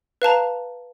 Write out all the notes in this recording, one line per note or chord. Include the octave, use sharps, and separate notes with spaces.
B4 F5 A5 A#5